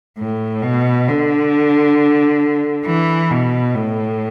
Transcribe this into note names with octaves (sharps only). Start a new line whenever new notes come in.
A2
B2
D3
E3
B2
A2